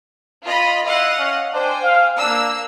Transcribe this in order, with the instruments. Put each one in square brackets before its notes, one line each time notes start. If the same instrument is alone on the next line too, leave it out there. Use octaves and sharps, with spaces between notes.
[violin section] F4 D#5 B5
[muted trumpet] E4 [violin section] D#5 F5 F#5
[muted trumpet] C#4
[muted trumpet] D4 [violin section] C5 G5 G#5
[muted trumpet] F5
[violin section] A#3 E6 [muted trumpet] D4